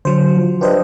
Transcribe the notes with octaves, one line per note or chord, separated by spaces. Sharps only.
D3 F#3 C5
F3
G2 G4 C5 D#5